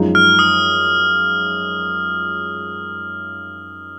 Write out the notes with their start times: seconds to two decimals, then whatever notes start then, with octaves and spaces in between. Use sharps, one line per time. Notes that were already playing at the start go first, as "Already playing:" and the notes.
Already playing: F#2 F3 G#3 D#4
0.15 F6
0.39 D#6